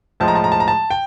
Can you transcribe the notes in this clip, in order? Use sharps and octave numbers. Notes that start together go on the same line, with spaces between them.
A2 F3 G#3 A5
A#5
A5
A#5
A5
A#5
A5
G5